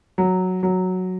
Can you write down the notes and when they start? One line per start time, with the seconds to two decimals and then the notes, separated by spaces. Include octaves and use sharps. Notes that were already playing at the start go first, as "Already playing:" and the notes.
0.18 F#3
0.63 F#3